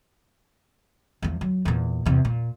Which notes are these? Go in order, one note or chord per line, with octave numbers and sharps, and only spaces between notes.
E2 F3
F#3
E2 A#2
E2 C3
A#2